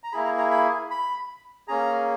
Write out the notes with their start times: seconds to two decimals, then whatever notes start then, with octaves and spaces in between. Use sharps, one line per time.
0.03 A#5
0.12 A#3 E4 G#4 B5
0.25 A#5
0.38 A#5
0.51 B5
0.91 B5
1.68 A#3 C#4 G#4 A#5